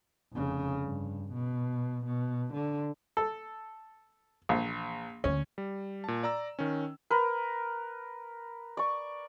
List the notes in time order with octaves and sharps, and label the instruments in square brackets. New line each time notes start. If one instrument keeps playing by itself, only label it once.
[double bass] F1 C#3
G2
B2
B2
D3
[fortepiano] A4
[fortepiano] A#1 [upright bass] E3
[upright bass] D2 F4 [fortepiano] C#4
[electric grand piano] G3
A#2 A5
D5 A#5 E6
D#3 C#4
[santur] A#4 B4
D5 C#6